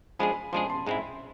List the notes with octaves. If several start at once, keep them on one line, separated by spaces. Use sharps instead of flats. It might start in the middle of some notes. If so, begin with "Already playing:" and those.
F3 G#3 D4 G#4 G#5 B5
F3 G#3 D4 G#4 A5 C6
A5 C6
G#2 G#3 C4 E4